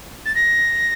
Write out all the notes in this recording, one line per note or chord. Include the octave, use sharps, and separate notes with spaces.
A6
A#6